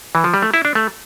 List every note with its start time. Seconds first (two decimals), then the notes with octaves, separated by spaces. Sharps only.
0.15 E3
0.24 F3
0.34 G3
0.42 A3
0.54 E4
0.65 D4
0.75 A3